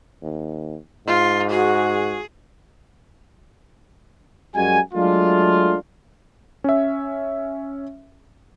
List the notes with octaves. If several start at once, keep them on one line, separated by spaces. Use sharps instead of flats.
D#2
G#2 F4
F#4 G#4
F#2 G3 G#3 F#4 G#5
F#3 G#3 A3 D4 F4
C#4 E5